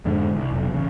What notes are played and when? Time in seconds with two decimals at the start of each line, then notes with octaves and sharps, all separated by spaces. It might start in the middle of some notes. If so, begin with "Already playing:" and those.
0.05 F2 G#2 D3
0.36 C2
0.50 F1 B1
0.74 A1 C#3